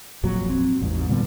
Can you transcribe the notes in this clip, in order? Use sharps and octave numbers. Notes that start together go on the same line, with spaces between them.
G#1 F2 A#2 F#3
C4
A1 E2 G#2
A#2 D3 G3 B3